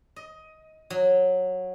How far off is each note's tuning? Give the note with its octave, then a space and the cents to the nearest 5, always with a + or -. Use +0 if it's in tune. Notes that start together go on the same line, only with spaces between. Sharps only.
D#5 +15
F#3 -15